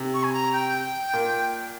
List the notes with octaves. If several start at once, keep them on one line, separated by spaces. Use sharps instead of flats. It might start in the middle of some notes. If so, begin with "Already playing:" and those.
Already playing: C3
C#6
G#5
A#5
G5
A#2